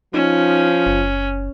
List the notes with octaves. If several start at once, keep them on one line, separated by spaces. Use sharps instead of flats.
F3 C#4 D#4
F#1